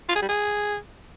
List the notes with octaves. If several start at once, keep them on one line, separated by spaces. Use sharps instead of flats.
F4
G#4
G3
G#4